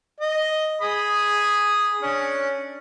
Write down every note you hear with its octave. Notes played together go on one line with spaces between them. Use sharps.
D#5
G#4 B5 D#6
C#4 D4